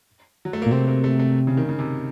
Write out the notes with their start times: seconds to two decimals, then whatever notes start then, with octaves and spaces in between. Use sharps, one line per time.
0.45 F#3
0.53 A3
0.62 A#3
0.66 A#2
0.71 C3 C4
0.88 A#3
1.04 A3
1.19 A3
1.47 C#3
1.57 D#3
1.69 C#3
1.79 C3